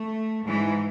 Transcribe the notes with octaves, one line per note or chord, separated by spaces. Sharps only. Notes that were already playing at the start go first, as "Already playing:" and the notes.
Already playing: A3
G#2 E3